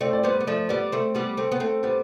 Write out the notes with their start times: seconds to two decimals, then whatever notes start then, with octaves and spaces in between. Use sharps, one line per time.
0.01 A3 C4 D5
0.13 D5
0.23 G3 B3 C5
0.41 B3
0.47 F3 A3 D5
0.69 G3 B3 D5
0.92 A3 C4
1.15 G3 B3
1.37 A3 C4
1.52 B3
1.60 A3 C4
1.83 G3 B3 C5